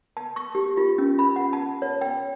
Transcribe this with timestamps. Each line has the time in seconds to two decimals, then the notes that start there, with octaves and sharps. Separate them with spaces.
0.17 A5
0.36 C#6
0.55 G4
0.77 F4
0.98 C#4
1.19 B5
1.36 F#5
1.53 A5
1.82 C#5
2.01 G5